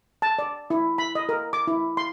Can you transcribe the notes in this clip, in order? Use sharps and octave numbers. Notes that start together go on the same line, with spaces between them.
A5
D5
E4
B5
D#5
A#4
D6
E4
C6